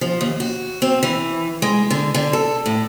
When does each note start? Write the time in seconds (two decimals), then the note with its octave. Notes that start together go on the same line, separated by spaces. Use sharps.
0.01 F3
0.21 D#2
0.40 F#4
0.82 C4
1.03 E3
1.62 G#3
1.90 D3
2.14 D3
2.33 A4
2.66 A2